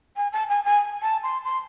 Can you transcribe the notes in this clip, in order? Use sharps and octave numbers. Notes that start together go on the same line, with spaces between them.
G#5
A5
G#5
G#5
A5
C6
C6